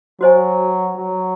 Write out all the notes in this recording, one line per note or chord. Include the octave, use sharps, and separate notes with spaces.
F#3 F#4 C5 D#5 G#5
F#3